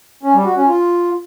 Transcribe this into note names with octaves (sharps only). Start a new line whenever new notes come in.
C#4
G3
F#4
C#4
F4